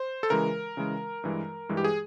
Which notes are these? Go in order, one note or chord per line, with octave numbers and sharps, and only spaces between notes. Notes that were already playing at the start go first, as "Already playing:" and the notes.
Already playing: C5
A4
C#3 E3 G#3 A#4
C#3 E3 G#3
G2 E3 G#3
G2 E3 G#3
G4
G#4